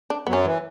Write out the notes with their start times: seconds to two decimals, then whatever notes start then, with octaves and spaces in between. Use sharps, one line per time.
0.10 D4
0.27 F#2 F#3 B3
0.33 C#4
0.44 E3